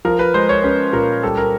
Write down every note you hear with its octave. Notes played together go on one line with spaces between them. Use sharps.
F3 A#4
B4
G#3 C5
C#5
C#4 B4
A#2 A#4
G3 A4
A#4